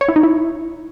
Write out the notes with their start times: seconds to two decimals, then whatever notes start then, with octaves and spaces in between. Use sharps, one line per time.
0.01 C#5
0.08 E4
0.16 D#4
0.23 E4